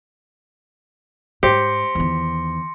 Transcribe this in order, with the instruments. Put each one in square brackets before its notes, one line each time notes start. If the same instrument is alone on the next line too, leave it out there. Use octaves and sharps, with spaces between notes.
[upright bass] G#2 [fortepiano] G4 [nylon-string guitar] C5 [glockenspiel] C6 A#6 C#7
[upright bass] E2 D#3